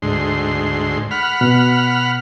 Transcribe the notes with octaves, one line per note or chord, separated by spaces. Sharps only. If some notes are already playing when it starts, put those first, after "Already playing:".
D2 G#2 C6
F#5 B5 F6
B2